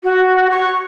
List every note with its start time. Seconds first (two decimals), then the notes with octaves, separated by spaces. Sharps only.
0.03 F#4
0.50 C#6